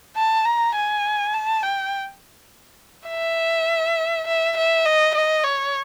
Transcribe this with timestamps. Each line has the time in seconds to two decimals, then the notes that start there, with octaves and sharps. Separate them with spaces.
0.16 A5
0.45 A#5
0.75 G#5
1.34 A5
1.63 G5
3.09 E5
4.27 E5
4.57 E5
4.85 D#5
5.15 D#5
5.44 C#5